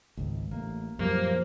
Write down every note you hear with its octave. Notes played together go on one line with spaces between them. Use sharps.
G#1 C#2
A1 A#3
F#2 A#2 F3 G3 A#3